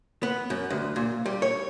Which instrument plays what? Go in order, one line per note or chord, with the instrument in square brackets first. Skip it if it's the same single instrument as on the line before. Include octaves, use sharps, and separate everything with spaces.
[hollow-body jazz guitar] B3
F#2
D2
A#2
G3
C#5